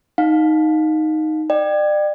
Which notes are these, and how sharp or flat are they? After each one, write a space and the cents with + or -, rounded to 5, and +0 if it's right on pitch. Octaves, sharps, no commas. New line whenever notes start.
D#4 +0 F5 +30
D5 +35 G5 -5